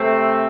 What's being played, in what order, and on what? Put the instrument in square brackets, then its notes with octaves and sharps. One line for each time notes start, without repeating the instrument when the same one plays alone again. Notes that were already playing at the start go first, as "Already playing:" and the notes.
Already playing: [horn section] C3 A3 C4